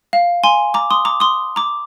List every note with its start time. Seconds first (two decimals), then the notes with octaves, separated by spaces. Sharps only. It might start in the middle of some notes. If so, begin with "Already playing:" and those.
0.13 F5
0.44 G#5 C6
0.74 A#5 D6
0.91 C6 D#6
1.05 A#5 D6
1.20 C6 D#6
1.56 A#5 D6